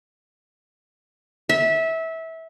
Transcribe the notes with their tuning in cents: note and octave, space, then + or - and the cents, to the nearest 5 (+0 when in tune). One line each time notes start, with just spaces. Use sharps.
E5 -20